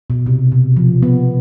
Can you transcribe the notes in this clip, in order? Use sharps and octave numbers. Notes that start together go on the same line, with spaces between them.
B2
C3
B2
F3
B3